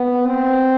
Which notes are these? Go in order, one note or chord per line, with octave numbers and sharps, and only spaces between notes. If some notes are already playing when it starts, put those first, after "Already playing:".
Already playing: B3
C4